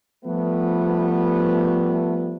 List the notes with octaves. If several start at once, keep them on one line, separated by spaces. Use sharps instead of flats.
F3 G3 A3 B3